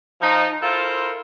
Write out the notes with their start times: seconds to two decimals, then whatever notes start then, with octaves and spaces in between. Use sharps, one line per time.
0.21 F3 D#4
0.63 E4 F4 A4 A#4 C5